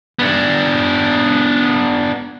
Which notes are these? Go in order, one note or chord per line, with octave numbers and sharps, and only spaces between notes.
B3 D4